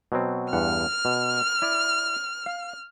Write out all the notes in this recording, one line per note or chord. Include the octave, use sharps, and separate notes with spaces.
B2 F#3 C4
E2 G2 F#5 F6
B2
E4 D5
F5